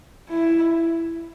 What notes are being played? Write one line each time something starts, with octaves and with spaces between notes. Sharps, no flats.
E4